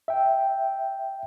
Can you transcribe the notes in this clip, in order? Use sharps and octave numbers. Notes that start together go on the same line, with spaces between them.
E5 G5